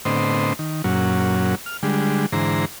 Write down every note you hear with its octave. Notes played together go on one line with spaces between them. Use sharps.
A2 D3 B3 C4 C5 D#5
D#3
F#2 A#2 F#3 C#4
F6
D3 G3 G#3
G#2 D3 E3 C5 A#5